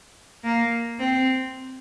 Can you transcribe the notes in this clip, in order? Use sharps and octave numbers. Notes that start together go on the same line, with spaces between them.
A#3
C4